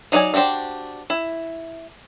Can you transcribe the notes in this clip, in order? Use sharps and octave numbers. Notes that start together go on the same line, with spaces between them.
F#3 D#4 F#4 D5 G#5
D4 F#4 G4 C5 D5
E4